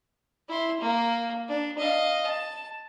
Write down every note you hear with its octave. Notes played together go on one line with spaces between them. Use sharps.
E4 C6
A#3
D4
D#5 F5
A5